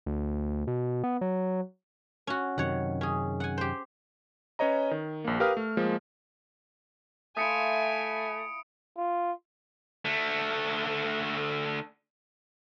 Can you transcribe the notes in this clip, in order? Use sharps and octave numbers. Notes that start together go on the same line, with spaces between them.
D2
B2
B3
F#3
C#4 F#4
F#2 C3 D#3 C#5 F#5
C#4 G#4
F#5 G#5
G4 C5
C#4 B4 C#5 D#5 A#5
D#3
A#1 A#3
G4 A#4 B4 F5 D#6 F6
A3
F3 G#3 A#3
A3 E4 F4 G#5 D#6 C#7 D7
F4
D3 A3